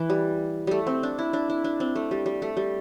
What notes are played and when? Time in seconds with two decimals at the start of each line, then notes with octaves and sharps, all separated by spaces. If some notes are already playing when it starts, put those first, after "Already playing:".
Already playing: E3
0.10 G3
0.67 G3 A3
0.87 C4
1.03 D4
1.19 E4
1.33 D4
1.50 E4
1.64 D4
1.80 C4
1.95 A3
2.11 G3
2.26 G3
2.42 A3
2.57 G3